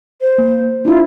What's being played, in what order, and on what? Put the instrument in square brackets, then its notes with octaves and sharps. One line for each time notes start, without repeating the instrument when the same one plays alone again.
[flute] C5
[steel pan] A#3
[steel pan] D4 E4 [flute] F4